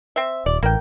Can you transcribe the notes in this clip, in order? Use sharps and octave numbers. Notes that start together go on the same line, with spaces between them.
C4 E5
D#1 D5
A1 A#3 G5